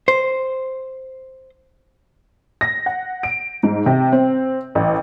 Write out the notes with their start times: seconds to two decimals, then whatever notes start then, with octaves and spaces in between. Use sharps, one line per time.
0.08 C5
2.61 A#6
2.86 F#5
3.23 D7
3.63 G#2
3.86 C3
4.12 C4
4.75 A1